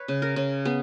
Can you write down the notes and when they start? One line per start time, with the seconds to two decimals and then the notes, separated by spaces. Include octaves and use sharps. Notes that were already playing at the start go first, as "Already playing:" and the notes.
Already playing: B4 C#5
0.08 C#3
0.22 A#4
0.36 C#3
0.65 B3 G#4